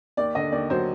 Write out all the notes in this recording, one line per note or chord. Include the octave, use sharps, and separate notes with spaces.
D#2 D5
D3 D#5
D#2 D5
F#3 C5